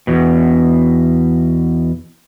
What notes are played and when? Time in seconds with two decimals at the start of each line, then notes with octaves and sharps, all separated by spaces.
0.07 E2 B2